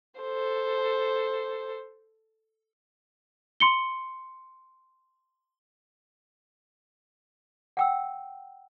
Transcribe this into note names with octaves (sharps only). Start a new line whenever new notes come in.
A4 C5
C6 C#7 G7
F#5 G5 E6